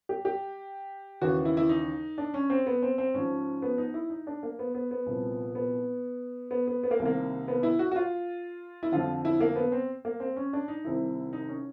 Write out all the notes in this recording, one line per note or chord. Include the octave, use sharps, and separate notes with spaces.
G4
G4
D#2 C#3 E3 F#4
E4
E4
D#4
D4
C#4
C4
B3
C4
C4
G#2 F3 C#4
B3
D#4
E4
D#4
D4
A#3
B3
B3
B3
C2 A#2 F3
B3
B3
B3
B3
A#3
C2 C3 D#3
A#3
B3
E4
F#4
F#4
F4
E4
F2 D3 F3 F4
E4
A#3
B3
C4
A#3
C4
C#4
D4
D#4
C2 C3 D#3 E4
D#4
C#4